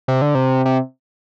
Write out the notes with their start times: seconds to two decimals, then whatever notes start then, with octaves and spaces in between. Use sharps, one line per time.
0.08 C3
0.22 D3
0.35 C3
0.65 C3